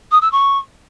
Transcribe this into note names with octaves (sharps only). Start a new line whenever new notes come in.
D#6
E6
C#6